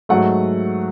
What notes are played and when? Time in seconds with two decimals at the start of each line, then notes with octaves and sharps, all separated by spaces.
0.09 G#2 F#3 A3 F#5